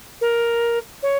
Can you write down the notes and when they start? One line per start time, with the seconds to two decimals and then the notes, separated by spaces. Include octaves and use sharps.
0.21 A#4
1.03 C#5